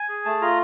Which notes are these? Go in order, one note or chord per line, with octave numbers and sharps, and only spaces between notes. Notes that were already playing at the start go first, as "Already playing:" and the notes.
Already playing: G#5
G#4
A3 A5
F4 A#5